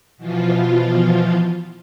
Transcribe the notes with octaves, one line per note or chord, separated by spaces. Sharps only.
B2 E3 F3 F4